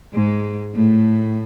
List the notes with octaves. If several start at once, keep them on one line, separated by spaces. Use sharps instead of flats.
G#2 G#3
A2 A3